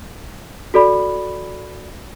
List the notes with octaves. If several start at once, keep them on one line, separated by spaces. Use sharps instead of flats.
F#4 A4 D5 B5